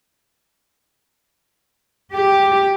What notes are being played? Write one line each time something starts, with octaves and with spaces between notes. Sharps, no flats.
G4